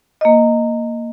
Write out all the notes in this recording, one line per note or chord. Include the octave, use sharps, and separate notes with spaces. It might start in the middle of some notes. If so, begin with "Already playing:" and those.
A#3 D#5